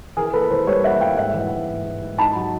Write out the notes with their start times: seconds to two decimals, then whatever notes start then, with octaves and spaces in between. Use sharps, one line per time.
0.17 E3 G#4 A#4
0.34 A#3 A4 B4
0.50 E3 A#4 C5
0.67 G3 B4 C#5
0.84 A#3 E5 F#5
1.01 G3 F5 G5
1.17 G#2 E5 F#5
1.34 E3
1.52 G#2
1.68 G#2
1.85 G#2
2.02 G#2
2.18 D#4 A5 B5
2.35 F#3